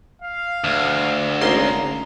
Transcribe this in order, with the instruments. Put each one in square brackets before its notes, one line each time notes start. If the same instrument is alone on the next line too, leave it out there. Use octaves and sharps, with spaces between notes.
[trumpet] F5
[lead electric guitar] D2
[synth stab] G#1 C#3 C6 [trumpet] A#5